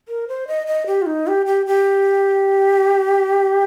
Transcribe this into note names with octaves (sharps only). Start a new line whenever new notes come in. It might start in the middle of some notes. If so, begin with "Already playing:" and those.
A#4
C5
D#5
D#5
G4
F4
D#4
G4
G4
G4